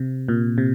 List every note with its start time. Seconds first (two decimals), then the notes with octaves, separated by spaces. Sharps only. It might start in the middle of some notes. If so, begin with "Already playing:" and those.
Already playing: C3
0.28 A#2
0.58 C3